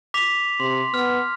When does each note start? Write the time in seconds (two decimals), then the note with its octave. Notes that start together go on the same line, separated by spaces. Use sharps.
0.14 D6 B6 F7
0.60 C3 C6
0.94 B3 F6